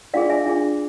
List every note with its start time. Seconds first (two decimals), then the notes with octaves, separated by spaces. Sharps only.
0.14 D4 F4 G#4 D5 F5
0.29 E5 G#5
0.46 D4 F4 G#4